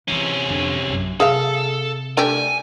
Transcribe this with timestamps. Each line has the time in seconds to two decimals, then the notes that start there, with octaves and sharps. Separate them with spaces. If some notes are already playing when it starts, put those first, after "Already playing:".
0.08 C3 D#3 E3 C#4
0.48 F2 D3
0.88 A#1 F#2
1.20 C3 G#4 A4 E5 F5
2.17 A3 D4 G4 G#5